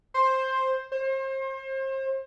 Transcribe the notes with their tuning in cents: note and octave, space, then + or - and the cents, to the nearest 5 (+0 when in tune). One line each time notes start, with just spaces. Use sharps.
C5 +10
C5 +35